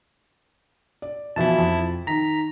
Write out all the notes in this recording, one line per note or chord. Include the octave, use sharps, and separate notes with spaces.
D5
B2 E3 F3 E4 A5
F2
D#3 A#5 B6